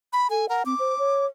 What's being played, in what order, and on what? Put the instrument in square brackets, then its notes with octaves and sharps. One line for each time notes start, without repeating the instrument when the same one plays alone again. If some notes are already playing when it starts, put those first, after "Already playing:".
[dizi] B5
[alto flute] A4 [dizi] G#5
[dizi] A#4 [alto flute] F#5
[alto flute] C4 [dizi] D6
[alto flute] C5
C#5